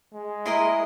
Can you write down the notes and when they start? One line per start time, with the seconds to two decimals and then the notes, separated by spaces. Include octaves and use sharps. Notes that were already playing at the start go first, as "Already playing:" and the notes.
0.13 G#3
0.46 E4 A#4 D#5 C6